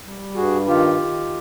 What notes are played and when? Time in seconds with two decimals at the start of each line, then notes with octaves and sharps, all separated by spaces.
0.04 G3
0.35 G2 F#4 G#4
0.67 D#3 F4 G4
0.99 D#3